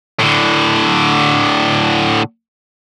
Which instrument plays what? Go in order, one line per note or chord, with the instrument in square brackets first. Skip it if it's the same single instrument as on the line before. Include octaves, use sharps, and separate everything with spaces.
[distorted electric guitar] A2 D3